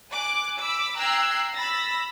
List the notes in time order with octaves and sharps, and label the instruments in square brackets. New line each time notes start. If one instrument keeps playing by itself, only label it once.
[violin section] G#5 D6 F#6
B5 D6 E6
G5 A#5 E6 F#6 G#6 C7
B5 E6 A6 A#6